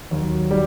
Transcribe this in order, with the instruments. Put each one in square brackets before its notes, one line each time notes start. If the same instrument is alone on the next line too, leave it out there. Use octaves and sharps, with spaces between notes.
[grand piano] D#2 [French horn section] F#3
[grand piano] G3